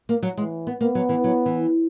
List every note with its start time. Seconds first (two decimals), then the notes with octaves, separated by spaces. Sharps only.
0.09 A#3
0.23 F#3
0.37 E3 G#3
0.67 B3
0.81 A#3 B3
0.95 F#3
1.09 E3
1.24 F#3
1.46 E3